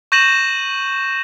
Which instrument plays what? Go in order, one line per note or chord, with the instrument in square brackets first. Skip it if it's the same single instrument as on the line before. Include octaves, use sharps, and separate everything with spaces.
[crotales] C#6 G6 A#6 D#7 E7 F#7